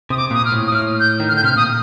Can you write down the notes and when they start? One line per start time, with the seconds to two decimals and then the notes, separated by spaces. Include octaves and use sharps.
0.10 C3 D#6
0.17 D6
0.31 A#2 D#6
0.45 F6
0.52 A2
0.67 D#6
0.72 A2 F6
1.00 G6
1.20 D#3
1.28 F6
1.32 D3 G6
1.44 C3 F6
1.56 A#2 D#6